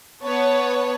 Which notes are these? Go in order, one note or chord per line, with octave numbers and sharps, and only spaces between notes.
B3 C#5 A5